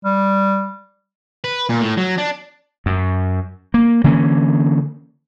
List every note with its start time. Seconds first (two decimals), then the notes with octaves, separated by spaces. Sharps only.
0.05 G3
1.44 B4
1.69 A#2
1.81 A2
1.97 F#3
2.18 D4
2.86 F#2
3.74 A#3
4.04 D3 E3 A#3 C#4